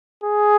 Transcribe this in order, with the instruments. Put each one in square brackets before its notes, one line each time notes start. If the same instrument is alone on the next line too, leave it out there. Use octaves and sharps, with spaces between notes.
[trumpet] G#4